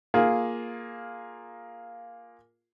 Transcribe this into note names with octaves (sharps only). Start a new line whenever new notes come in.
A#3 F4 G#4